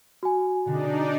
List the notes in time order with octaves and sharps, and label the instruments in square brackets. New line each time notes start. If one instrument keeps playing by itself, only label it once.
[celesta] F#4 G#5
[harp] B2 D3 C4 [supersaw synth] D4 D#4 D5